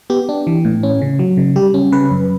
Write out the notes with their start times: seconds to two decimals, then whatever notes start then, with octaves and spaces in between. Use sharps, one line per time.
0.10 B3 G4
0.29 D4
0.47 E3
0.65 A2
0.83 C#4
1.02 C#3
1.19 F#3
1.37 C#3
1.56 G3 G4
1.74 C#4
1.92 C#3 B4
2.11 F#2